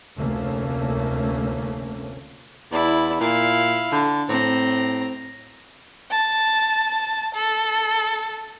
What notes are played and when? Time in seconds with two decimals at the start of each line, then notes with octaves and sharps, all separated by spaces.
0.16 F1 D2 A3 A#3 C#4
2.72 E2 E4 D5
3.21 A#2 E4 F5
3.92 D3
4.29 A2 C4 A#5
6.11 A5
7.34 A4